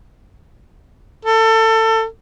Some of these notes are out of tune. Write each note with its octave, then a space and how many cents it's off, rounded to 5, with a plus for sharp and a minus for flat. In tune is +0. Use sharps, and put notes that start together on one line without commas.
A4 +25